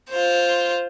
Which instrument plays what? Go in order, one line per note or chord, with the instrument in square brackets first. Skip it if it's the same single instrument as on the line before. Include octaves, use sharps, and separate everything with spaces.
[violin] F4 C5